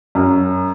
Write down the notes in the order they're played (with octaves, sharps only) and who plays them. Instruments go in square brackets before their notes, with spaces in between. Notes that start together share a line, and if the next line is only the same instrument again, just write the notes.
[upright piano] F#2